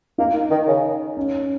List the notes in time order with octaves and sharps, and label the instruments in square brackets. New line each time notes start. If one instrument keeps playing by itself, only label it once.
[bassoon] A#3 [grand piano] D#4
[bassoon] D#3
C#3
[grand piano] C#4